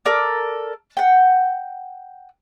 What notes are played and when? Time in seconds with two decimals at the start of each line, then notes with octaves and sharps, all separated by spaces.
0.05 A4 A#4 D5
0.97 F#5 G5